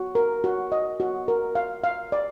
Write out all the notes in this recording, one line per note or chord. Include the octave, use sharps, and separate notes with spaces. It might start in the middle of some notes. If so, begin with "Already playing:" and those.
Already playing: F#4
A#4
F#4
D#5
F#4
A#4
F5
F5
D5